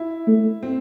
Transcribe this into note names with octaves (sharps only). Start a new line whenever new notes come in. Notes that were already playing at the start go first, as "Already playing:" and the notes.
Already playing: E4
A3
C4